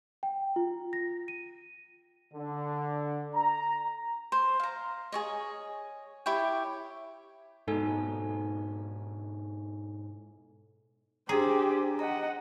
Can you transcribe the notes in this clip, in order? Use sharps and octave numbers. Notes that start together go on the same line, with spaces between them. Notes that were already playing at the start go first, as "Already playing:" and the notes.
G5
F4
A#6
D#7
D3
A#5
C5
F5 A#5
G#4 C#5 D#5
E4 G4 C#5 G5
G#2 B2 D#4 A4 G#5
D4 G4 G#4 C5 A#5
D#5 F#5 A#5